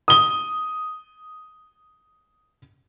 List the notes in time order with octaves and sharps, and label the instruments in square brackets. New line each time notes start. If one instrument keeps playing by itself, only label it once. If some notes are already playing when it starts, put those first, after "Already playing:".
[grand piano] D#6 G7